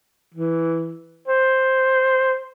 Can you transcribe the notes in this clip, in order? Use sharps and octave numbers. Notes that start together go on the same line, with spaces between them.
E3
C5